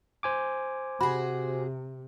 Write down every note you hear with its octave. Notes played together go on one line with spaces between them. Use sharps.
C5 G#5 D6
C3 F#4 G#4 B5